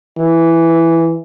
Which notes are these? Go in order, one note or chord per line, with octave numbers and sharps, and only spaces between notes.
E3